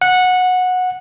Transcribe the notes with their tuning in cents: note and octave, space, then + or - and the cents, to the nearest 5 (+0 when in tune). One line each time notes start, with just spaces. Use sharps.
F#5 -15